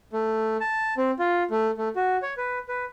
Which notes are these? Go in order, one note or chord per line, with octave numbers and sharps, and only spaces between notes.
A3
A5
C4
F4
A3
A3
F#4
C#5
B4
B4